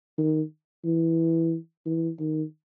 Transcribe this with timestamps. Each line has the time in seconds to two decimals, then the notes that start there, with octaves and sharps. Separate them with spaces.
0.18 D#3
0.84 E3
1.86 E3
2.19 D#3